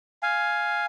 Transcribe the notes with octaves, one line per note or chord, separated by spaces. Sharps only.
F5 G#5